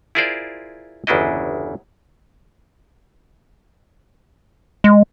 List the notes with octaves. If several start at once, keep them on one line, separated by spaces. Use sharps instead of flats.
E4 F4 G#4 A#4 C5 D5
G1 E2 C#3 D4 E4 D#5
G#3